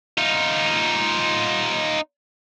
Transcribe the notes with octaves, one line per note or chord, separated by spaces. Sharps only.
D#4 F4